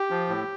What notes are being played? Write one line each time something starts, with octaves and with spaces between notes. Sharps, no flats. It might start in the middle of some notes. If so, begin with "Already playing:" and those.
Already playing: G4
F3
A2